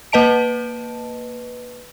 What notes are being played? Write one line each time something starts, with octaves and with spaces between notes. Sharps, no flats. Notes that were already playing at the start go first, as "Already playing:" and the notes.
A#3 B4 D#5 A5 D7